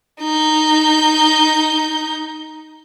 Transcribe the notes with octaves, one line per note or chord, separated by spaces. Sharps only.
D#4 G6